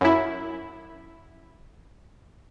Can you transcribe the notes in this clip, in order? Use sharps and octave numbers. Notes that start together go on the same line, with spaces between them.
F#2 E4